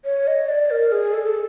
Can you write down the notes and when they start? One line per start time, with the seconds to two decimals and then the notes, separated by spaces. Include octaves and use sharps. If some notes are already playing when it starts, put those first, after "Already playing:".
0.05 C#5
0.27 D#5
0.49 D5
0.71 A#4
0.92 G#4
1.14 A4
1.25 A4